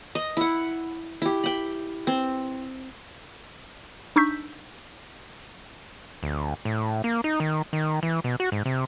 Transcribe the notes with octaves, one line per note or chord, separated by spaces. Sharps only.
D#5
E4 F#5
E4 G4
G5 B5
C4
D4 D#4 C#6 E6 G6 B6
D2
A2
A#3
D#4
D#3
D#3
E3
B2
F#4
G#2
C3